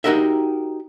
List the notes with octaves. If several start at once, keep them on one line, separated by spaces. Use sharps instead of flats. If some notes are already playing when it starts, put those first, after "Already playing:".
D#4 F#4 G4 A#4 D#5 E5